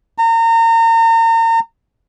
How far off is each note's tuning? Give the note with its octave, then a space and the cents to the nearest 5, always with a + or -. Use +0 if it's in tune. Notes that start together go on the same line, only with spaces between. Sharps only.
A#5 -35